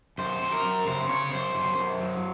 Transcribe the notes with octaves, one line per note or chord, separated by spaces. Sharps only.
F#2 C5
F#2
A#4
F#2
C#3 C5
C#3 C#5
F#2 C5
F#2
F#2
F#3